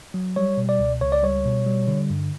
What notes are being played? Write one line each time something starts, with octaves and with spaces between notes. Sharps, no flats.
F#3
G3 C#5
B2
D5
C#2
C#2 C#5
D5
G3 C#5
B2
G3
D3
G2